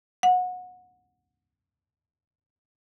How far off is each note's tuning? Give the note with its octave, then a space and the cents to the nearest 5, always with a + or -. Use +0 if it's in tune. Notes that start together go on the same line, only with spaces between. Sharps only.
F#5 -25